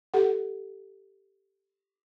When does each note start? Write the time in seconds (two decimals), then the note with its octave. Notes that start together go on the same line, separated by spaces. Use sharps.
0.14 G4 A4 F#5